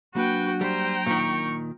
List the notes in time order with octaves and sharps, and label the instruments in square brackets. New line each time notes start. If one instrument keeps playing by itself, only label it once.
[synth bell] F#3 A#3 D4 [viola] F#4 G5 [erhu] B4
[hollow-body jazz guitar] G3 [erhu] C5 [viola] G5 A#5
[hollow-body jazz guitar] A#2 D#3 [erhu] C#6